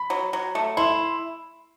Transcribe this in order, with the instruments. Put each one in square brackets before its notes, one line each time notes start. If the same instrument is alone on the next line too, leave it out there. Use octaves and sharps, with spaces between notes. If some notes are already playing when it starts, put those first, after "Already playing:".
Already playing: [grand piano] B5
[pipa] F#3
F#3
A3
[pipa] E4 [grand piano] C6